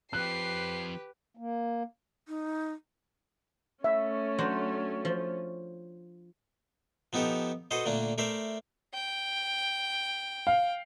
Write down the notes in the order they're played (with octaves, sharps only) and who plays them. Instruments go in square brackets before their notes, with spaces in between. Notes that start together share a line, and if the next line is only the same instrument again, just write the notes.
[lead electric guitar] F3 C4 [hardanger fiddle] G4 B4 [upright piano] F#6 [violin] C7
[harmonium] A#3
[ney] D#4
[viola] A3 C#4 [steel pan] E5
[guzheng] F#3 D4 C5
F3
[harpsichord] F3 B3 D#4 G4 A4
F#4 A4 B4 C5 D#5
A#2 D3 A3 A#3 D4
A3 A#4 C5 D5 E5
[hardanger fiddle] G5
[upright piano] F5